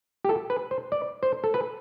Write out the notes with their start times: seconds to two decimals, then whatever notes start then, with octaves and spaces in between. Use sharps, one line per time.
0.25 G4
0.29 A4
0.50 B4
0.71 C5
0.92 D5
1.23 C5
1.44 A4
1.54 B4